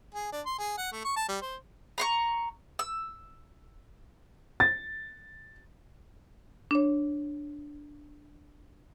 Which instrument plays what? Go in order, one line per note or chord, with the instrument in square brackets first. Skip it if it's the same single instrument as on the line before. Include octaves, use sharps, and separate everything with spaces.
[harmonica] G#4
D4
C6
G#4
F#5
A3
C#6
A5
G3
C5
[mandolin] A#5 C6 C#6
E6
[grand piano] A6
[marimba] D4 C#5